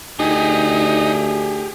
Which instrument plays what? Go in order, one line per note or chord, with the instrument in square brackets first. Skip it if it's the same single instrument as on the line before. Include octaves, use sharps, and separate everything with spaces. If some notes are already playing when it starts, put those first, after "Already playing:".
[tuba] D2 [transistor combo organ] D#4 [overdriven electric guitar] G4 G#4